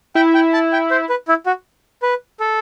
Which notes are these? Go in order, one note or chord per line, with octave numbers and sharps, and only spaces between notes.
E4 G5
G5
A5
G5
C5
B4
E4
F#4
B4
A4